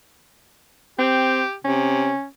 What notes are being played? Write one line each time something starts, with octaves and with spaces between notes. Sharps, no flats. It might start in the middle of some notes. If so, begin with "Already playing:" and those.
C4 G4
C3 C#4